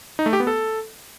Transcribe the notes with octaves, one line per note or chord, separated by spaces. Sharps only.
D#4
A3
G4
B3
A4